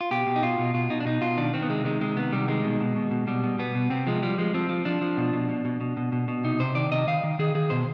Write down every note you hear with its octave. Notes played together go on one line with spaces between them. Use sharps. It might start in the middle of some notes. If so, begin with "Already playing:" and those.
F4
B2 G4
B2
D#4
B2 F4
B2
B2 F4
B2 D#4
D4
B2 D#4
B2 F4
D#3 D4
D#3 C4
B3
C3 G#3
D#3 G#3
C3 G#3
D#3 B3
C3 G3
D#3 G#3
B2
B2
B2
B2
B2 G3
B2
B2 B3
B2
C3 C4
F3 G#3
F3 G3
F3 G#3
F3 C4
F3
F3 D4
F3
B2
B2
B2
B2
B2
B2
B2
B2
C3 D#4
C3 C5
D#3 D5
C3 D#5
D#3 F5
D#3
D#3 G#4
D#3 G#4
B2 C5